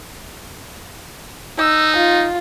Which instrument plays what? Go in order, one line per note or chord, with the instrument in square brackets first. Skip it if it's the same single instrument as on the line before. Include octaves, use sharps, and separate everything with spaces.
[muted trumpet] D#4 [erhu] E6
[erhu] F4